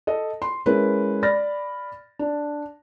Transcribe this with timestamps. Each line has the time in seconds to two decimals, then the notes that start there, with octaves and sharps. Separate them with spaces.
0.07 A4 D#5
0.42 C6
0.66 G#3 C#4 E4 A#4 B4
1.23 D5 B5 F6 A6 A#6
2.19 D4